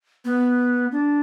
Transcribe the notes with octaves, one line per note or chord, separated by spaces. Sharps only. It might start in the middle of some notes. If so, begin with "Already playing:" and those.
B3
D4